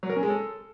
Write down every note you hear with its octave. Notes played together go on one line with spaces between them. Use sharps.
F#3
A#4
C#4
G#3
A4